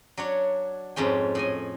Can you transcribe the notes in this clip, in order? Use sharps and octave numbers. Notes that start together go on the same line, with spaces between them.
F#3 D4 C#5
F2 G#2 C#4 G5
A2 D#5 G#5